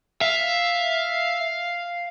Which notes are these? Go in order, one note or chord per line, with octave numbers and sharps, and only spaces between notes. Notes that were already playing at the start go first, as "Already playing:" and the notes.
E5 F5